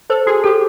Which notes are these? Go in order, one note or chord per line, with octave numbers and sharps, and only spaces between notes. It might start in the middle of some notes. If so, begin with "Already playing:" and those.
A4 C5
F#4 G#4
G4 A4